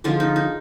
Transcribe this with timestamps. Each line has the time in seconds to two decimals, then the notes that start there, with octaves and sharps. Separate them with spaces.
0.04 D3 F3 G#3 F4
0.20 D#4
0.36 D#4